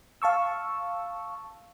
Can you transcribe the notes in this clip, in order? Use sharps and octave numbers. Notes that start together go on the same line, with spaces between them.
F5 A5 C#6 E6